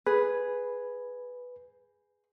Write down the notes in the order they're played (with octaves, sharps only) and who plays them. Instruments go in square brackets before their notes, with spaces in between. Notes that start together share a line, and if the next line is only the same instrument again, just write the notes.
[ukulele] G#4 [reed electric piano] B4